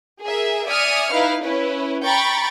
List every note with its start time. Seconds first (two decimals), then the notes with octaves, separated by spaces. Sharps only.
0.23 G#4 A#4 E5
0.66 D5 E5 G#5 D#6 F6 C#7
1.12 D#4 E4 B4 F5
1.43 C#4 E4 B4
2.05 G5 A#5 B5 C#6 A6